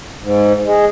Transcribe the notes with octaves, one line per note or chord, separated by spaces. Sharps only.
G#2
G#3